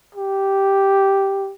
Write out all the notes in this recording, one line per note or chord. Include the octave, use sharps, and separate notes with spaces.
G4